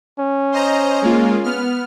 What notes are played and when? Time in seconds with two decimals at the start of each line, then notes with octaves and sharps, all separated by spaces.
0.19 C#4
0.52 C5 D#5 A#5
1.02 G#3 A#3 F4
1.44 B3 F6